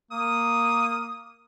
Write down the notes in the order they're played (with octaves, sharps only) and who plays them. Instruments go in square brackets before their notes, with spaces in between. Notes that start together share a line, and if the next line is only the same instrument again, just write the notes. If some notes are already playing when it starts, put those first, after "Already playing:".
[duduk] A#3 [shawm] D#6